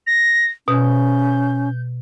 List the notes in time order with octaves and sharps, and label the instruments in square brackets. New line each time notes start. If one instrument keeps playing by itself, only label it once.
[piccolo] A#6
[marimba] B2 [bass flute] C#4 [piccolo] G6